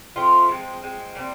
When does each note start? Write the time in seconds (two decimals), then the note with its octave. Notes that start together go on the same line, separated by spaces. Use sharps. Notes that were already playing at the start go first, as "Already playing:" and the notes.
0.16 F3 A3 C4 F4
0.48 F3 G#3 C4
0.82 F3 G#3 C4
1.15 A#2 G3 C4